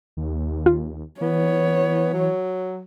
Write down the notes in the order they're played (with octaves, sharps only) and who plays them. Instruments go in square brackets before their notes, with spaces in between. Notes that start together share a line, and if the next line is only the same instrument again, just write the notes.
[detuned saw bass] D#2
[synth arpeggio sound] F4
[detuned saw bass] E3 [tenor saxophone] B3 [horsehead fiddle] C#5
[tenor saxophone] F#3